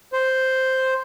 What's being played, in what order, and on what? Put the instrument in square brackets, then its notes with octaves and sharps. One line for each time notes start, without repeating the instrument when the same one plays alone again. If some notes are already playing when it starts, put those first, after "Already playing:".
[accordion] C5